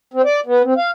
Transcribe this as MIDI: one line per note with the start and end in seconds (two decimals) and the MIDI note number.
0.14 0.22 60
0.25 0.40 74
0.46 0.62 59
0.64 0.74 60
0.77 0.91 77